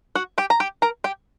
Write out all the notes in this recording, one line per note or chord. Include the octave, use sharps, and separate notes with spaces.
F#4 F#5
G4 G5
A#5
G4 G5
A#4 A#5
G4 G5